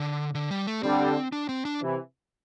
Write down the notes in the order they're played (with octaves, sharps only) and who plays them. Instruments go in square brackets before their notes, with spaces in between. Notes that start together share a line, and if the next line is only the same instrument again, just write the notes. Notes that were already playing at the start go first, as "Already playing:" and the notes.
Already playing: [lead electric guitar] D3
D3
G3
A3
[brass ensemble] D3 G3 [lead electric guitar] C4
[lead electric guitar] D4
C4
D4
[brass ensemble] C3 E3